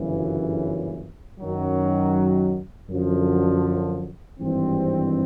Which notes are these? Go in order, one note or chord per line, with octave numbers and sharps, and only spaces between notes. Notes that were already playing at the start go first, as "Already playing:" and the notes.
Already playing: G1 F#2 C#3 E3
F#2 D#3 F#3
F#2 D3 F3
G#1 G2 E3 G3 C4